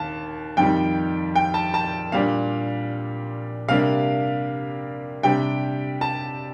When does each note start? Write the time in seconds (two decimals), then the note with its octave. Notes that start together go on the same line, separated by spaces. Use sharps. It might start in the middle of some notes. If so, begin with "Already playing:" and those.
Already playing: D#2 D#3 A5
0.57 F2 D#3 G3 G5
1.36 G5
1.54 A5
1.74 A5
2.12 A#2 G3 D4 F5
3.68 C3 G3 A#3 D4 F5
5.23 C3 G3 D4 G5
6.01 A5